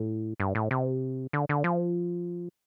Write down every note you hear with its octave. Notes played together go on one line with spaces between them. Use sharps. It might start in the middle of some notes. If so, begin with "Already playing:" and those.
Already playing: A2
G2
A2
C3
D3
D3
F3